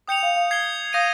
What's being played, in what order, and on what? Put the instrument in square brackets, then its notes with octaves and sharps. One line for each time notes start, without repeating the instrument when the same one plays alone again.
[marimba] G5 [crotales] D#6 G6 C#7 F7
[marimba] F5
F5
[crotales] G#6 C7 G7
[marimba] F5 [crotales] D#6 G6 A#6 D#7